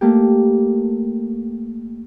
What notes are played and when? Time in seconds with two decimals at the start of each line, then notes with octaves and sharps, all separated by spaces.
0.01 A3 A#3 G4